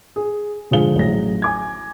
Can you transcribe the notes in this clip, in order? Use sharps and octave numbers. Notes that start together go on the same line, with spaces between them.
G#4
G#2 D3 F3 G#4 F5 G7
A1 F#3 G#4 A#6
G#5 D6 G#6